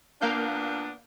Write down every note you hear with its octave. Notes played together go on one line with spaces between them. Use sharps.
A#2 A#3 B3 D4 F5 G6